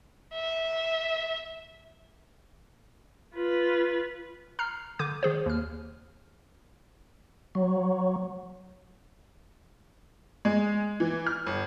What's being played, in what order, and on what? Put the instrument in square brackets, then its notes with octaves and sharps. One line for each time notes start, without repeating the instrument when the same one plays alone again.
[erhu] E5
[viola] F4 B4
[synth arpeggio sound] A#5 F6 C7
D3 D6 G6 D#7
D#3 G#4 C5
D#2 F6
[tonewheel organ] F#3
[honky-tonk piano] G#3
E3
F6
G1